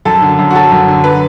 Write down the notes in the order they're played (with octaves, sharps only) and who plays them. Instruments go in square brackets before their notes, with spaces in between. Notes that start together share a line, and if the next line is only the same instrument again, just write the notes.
[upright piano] F#2 A4
D3
F#2
F#4
F#3 A4
F#2
D3
F#3 B4